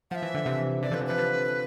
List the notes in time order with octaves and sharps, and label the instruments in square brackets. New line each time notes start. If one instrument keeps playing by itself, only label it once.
[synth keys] F3 [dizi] E5 F#5
[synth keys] E3
D3
C3 E3
[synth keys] C3 E3 [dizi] D5
[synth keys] D3 F3
[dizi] B4
[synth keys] C3 E3
[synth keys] D3 F3 [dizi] B4
[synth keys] D3 F3